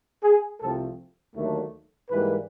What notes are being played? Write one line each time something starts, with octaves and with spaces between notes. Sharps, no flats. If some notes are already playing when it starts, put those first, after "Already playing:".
G#4
C2 C3 F3 A3 C4 A4
D#2 D3 F#3 A3
G#2 E3 G3 A#3 B4